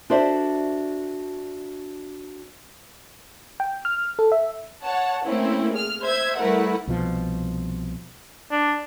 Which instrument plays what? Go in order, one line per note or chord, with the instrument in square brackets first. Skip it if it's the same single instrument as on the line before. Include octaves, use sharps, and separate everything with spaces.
[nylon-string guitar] D4 F#4 A4 C5 D5 E5
[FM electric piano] G5
F6
A4
E5
[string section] C#5 F#5 A5
A3 A#3 C4 C#4 E4
G#4 F6
C5 E5 G#6
G3 A3 E4 A#4 B4 F#5
[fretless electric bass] C2 B2 F3
[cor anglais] D4